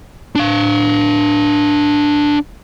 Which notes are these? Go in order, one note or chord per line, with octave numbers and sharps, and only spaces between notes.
D4 F5